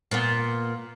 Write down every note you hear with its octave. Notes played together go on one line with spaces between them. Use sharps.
A#2 B3